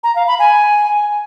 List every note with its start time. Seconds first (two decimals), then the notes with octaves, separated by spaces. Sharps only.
0.03 A#5
0.15 F5
0.27 B5
0.39 G#5